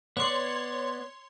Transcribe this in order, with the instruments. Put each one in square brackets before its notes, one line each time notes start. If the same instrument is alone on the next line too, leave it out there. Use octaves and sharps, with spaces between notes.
[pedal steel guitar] B3 D5 [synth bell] C#5 C6